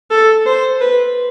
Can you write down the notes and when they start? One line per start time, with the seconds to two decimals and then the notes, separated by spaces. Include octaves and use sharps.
0.11 A4
0.46 C5
0.81 B4